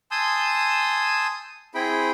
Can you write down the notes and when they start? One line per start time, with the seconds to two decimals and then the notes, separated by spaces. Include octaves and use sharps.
0.11 G#5 A5 C6 D#6 E6 G6
1.75 C4 E4 G#4 G5 B5